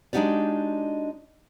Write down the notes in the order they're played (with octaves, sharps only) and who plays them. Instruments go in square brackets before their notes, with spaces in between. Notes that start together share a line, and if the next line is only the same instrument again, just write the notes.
[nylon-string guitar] G#3 D4 D#4 F#4 G4 D5